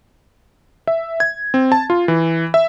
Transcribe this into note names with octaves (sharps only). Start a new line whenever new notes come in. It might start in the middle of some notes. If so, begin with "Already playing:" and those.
E5
G#6
C4
A5
F4
E3
E5